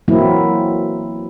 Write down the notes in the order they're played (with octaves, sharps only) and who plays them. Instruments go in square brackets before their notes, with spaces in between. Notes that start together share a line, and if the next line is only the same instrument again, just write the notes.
[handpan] E3 F#3 A#3 C4 E4